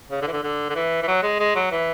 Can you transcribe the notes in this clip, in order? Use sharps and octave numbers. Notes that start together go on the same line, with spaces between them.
C#3
D3
E3
D3
D3
D3
E3
E3
F#3
G#3
G#3
F#3
E3